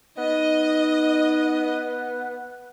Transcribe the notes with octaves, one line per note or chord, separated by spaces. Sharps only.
B3 D#4 D#5